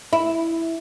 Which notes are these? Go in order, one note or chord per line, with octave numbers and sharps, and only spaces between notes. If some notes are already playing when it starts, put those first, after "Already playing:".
E4